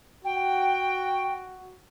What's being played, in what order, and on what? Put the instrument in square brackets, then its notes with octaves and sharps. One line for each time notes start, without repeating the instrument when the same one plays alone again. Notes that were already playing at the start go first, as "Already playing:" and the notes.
[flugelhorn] F#4 [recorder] G5